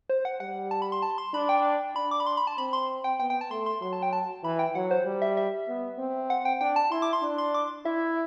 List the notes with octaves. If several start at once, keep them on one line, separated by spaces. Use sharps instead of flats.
C5
F#5
G3 F#5
A5
B5
C6
A5
C6
D4 B5
G5
D4 B5
D6
B5
C6
B5
A5
C4 B5
C6
G5
B3 G5
G5
A5
A3 C6
C6
F#3 C6
A5
G5
A5
E3 B5
G5
F#3 F#5
C5
G3
E5
E5
B3
C4
F#5
G5
D4 G5
A5
E4 C6
D6
C6
D4
C6
D6
E4 E5